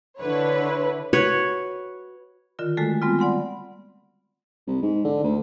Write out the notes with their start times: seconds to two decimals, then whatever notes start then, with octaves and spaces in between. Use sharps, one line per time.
0.19 D3 E4 B4 C#5
1.13 F#4 B4 C#5
2.59 D3 D#3 F4 A#4
2.77 G#3 A3 F#4 A4
3.02 G3 G#3 B3 C4 F4
3.19 D5 F#5 B5 C6
4.67 C2
4.82 G#2
5.04 D3
5.24 D2